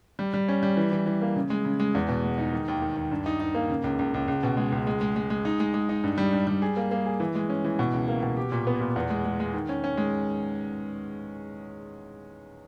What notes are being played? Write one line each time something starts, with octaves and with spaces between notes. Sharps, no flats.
G3
G3
C#4
G3
E3
E3
E3
A#3
C#3
G#3
C#3
G#3
E2
B2
G#3
D#4
D#3
D#2
D#3
D#2
G2
D#4
D#4
A#3
C#3
C#2
C#2
C#2
C#2
B2
G#3
C#2
G#3
G#3
G#3
G#3
D#4
G#3
G#3
D#4
G2
G3
G2
G3
G#4
A#3
A#3
G#4
E3
G#3
C#4
E3
B2
C#2
A#3
B2
G4
A#2
B3
A#2
E2
G#3
G#3
G#3
D#3
C#4
C#4
G#3